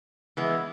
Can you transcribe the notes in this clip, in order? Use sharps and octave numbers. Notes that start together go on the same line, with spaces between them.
E3 G#3 B3